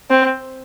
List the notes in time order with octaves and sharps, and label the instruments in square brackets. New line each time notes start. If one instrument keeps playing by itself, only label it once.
[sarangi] C4